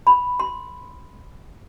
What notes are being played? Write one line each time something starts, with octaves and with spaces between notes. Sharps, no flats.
B5
C6